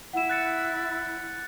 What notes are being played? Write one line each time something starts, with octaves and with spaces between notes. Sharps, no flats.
E4 F#5 E7
F#6 A6 C#7